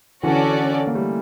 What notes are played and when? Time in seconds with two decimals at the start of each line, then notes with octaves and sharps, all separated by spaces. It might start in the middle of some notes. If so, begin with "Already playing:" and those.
0.23 D3 E3 C#4 F#4 A4 D5
0.87 A#3
0.95 G3 A3